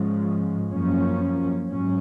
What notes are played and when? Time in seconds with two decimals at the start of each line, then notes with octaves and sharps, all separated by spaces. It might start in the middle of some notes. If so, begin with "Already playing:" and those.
Already playing: G#2 F3 G#3 C#4
0.72 F#2 F3 A#3 C#4
1.68 G#2 F#3 C#4